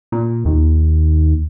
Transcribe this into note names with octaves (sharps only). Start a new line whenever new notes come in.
A#2
D#2